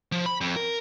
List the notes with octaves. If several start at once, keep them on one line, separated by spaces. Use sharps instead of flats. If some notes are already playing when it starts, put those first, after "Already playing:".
F3
B5
F2
A#4